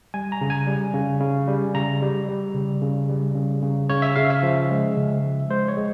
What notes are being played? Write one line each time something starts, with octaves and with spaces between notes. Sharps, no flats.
G3 G#5
A#5
C#3
G#5
G3
C#3
C#3
G3
C#3 A#5
G3
G3
C#3
C#3
G3
C#3
C#3
C#3 C#5
E5
C#3 F5
E5
F3
G#3
C#3
F3
G#3 C5
C#5
G#3